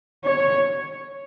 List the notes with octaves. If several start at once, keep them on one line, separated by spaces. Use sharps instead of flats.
C#5